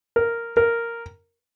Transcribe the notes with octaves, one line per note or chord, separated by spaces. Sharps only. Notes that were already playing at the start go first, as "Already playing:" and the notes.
A#4
A#4